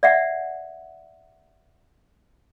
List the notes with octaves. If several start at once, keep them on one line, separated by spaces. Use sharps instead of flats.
D5 E5 F#5